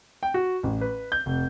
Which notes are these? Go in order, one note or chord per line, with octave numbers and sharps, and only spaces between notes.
G5
F#4
A1
B4
G6
F1